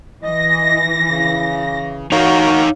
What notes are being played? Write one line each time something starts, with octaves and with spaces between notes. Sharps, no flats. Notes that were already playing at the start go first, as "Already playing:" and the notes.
E3 D#5 A#6
C#3
D#4 F#4 A#4 C#5 F5